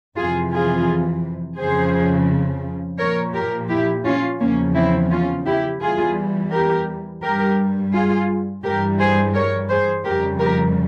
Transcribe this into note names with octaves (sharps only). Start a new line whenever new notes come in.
F2 C3 E3 F4 G#4
F4 G#4
F2 C#3 F3 G#4 C5
A#2 F3 A#4 C#5
G4 A#4
E4 G4
C#4 F4
E2 C#3 F3 A#3 C#4
C4 E4
C#4 F4
E4 G4
E2 E3 G3 F4 G#4
G4 A#4
G2 G3 G4 A#4
F4 G#4
G2 E3 G3 G4 A#4
G#4 C5
A#4 C#5
G#4 C5
F2 C#3 G3 G4 A#4
G4 A#4